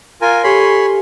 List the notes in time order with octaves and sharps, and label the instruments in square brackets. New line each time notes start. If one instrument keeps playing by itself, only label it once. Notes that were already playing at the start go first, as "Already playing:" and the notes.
[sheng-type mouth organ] F4 A#4 G#5
[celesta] G4 A4 G#5 [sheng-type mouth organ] C#5 B5 C6